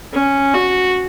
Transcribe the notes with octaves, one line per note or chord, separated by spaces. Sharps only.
C#4
F#4